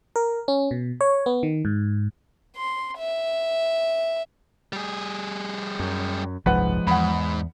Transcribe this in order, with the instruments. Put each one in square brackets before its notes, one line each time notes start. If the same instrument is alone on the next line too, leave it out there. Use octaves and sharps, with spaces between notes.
[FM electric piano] A#4
C#4
B2
C#5
B3
D#3
G#2
[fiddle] C6
E5
[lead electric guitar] G3 G#4
[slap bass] F#2
[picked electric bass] F#1 C2 G#2 [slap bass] F3 G#3 [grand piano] B4 F#5
[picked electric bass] E2 [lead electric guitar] G#2 [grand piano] F#5 B5